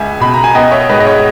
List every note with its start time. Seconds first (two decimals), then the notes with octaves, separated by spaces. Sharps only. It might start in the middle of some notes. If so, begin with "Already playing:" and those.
Already playing: C#2 E5 G#5
0.20 B2 B5
0.34 A#5
0.44 G#5
0.55 B3 D#5 G5
0.71 C#5 E5
0.89 G#2 B4 D#5
1.00 D#5
1.07 C#5